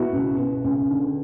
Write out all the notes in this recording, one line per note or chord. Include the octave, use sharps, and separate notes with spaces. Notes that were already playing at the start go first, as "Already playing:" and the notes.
Already playing: B2 E4 F#4
C#2
B2
C#2
D3